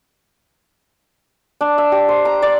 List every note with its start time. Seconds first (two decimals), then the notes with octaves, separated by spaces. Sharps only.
1.61 D4
1.78 E5
1.92 G4
2.09 C5
2.25 A#5
2.42 D5